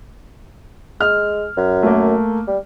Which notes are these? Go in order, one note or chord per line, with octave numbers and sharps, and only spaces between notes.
G#3 F6
F#2
A3 A#3
G3